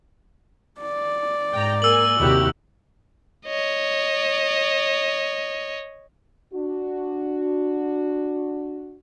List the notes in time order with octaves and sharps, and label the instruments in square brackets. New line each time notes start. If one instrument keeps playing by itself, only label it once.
[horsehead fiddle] D5
[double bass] G#2 [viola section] G5 A#5
[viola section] A#3 A#4 G#5 [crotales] E6 F#7
[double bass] D#2 C3 [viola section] E4 F#4 G4
[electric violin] C#5 D#5
[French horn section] D4 F#4